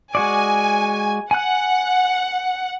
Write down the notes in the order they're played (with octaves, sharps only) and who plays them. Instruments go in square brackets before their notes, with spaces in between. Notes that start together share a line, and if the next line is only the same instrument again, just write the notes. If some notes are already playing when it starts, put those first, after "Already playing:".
[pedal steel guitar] G#3 F#4 D5 [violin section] G#5
[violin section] F#5 [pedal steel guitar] G#5 F#6